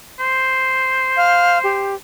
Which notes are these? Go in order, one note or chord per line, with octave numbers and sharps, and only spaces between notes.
C5
F5
G4